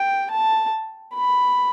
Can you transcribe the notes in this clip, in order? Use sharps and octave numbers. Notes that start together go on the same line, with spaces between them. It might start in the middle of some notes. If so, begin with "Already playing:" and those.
Already playing: G5
A5
B5